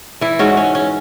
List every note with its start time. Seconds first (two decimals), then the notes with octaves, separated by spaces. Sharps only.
0.21 E3 E4
0.39 G#2 C#4 F#4
0.57 C#4
0.75 C#4